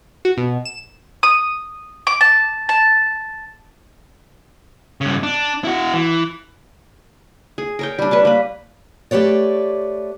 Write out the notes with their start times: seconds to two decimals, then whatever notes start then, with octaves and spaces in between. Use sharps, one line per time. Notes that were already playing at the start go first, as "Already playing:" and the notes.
0.25 F#4
0.38 B2
0.65 E7
1.23 D#6
2.07 D6
2.21 A5
2.69 A5
5.01 G2 C#3
5.23 D4
5.64 E4 F#4
5.94 E3
7.58 G#4
7.79 A#4 C#5 G5
7.99 G3 D4
8.11 B4 C#5 A5
8.25 A#3 B4
9.11 A3 G4 B4 C#5 D5